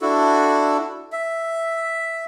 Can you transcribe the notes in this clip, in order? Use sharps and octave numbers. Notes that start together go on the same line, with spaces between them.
D4 E4 F#4 A4
E5